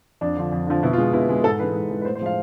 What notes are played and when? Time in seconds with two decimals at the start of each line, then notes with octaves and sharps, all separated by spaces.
0.21 F2 D4
0.37 D3 F3
0.52 F2
0.67 D3 F3
0.83 B2 E4
0.93 F4
0.98 G#3
1.13 B2 E4
1.29 G#3
1.44 G#2 A4
1.59 E3 G#3 B4
1.75 G#2
1.90 E3 G#3
2.01 B4
2.05 A2 C5
2.15 C5
2.21 F3 G#3 F5